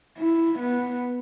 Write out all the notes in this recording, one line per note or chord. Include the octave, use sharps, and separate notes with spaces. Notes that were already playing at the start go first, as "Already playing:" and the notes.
E4
B3